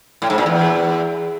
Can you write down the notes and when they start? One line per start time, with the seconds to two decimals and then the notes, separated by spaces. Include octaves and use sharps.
0.22 A2
0.30 G#2
0.38 A#2
0.46 E2